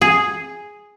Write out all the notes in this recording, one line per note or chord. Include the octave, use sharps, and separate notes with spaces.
G#4